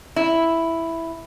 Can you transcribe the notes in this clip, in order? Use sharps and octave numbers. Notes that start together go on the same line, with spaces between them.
E4